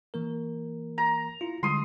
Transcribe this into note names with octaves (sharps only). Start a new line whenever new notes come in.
E3 A#3 A#4
A#5
E4 F4
D3 G3 G#3 C6 D#6